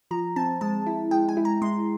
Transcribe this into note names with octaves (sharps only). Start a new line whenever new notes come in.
F3 A#5
C4 A5
G#3 A5
E4
G#3 G5
G#5
E4
A#5
G#3 C6